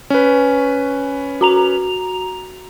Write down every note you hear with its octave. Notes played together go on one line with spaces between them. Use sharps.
C#4 B4
F#4 A#5 F7